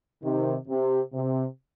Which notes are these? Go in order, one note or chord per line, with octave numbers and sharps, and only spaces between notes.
C3 D#3
C3
C3